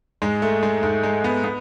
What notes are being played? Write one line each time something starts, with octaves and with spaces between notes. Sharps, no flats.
G#2 G#3
A3
G#3
G#2 A3
G#3
B3
B3